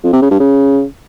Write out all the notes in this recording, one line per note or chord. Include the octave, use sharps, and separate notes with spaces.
F2
C3
C#3
G2
C#3